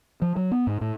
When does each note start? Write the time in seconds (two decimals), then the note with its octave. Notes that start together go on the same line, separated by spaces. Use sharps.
0.22 F3
0.36 F#3
0.51 B3
0.67 G#2
0.81 A2